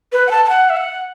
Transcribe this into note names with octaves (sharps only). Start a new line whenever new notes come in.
B4
F#5
A5
A5
F#5
E5
F#5